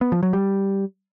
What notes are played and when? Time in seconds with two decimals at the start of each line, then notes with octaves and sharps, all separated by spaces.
0.01 B3
0.12 F3
0.23 F#3
0.33 G3